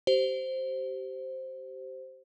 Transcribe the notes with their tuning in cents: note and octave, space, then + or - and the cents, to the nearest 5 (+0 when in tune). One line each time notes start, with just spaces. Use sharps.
G4 -30 C5 +0